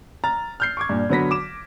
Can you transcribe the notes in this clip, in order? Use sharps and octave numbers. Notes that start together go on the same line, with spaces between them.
A#5 F6 A6
F6 G6 C7
C#6 D6 G#6
G2 A#2
D3 F#3 B3 B4 A#6 B6
D6 E7